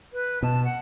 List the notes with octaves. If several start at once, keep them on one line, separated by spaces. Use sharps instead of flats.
B4
B2 A5
F#5